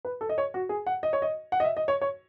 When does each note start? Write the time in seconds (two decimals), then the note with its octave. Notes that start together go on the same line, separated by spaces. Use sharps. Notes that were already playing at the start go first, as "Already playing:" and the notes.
0.05 B4
0.21 A4
0.29 D#5
0.38 C#5
0.54 F#4
0.69 G#4
0.86 F#5
1.03 D#5
1.13 C#5
1.22 D#5
1.52 F#5
1.60 D#5
1.64 E5
1.77 D#5
1.88 C#5
2.02 C#5